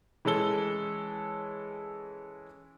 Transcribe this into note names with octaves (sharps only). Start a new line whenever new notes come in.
E3 G#3 C#4 A4 G7